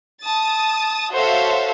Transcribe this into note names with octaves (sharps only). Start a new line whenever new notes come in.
A5 D#6 A6
F#4 A4 C5 C#5 E5 F5